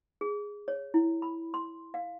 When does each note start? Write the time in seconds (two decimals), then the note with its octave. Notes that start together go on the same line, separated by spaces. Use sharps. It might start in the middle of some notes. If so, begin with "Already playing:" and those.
0.21 G#4
0.68 C#5
0.94 E4
1.22 B5
1.54 C6
1.94 F5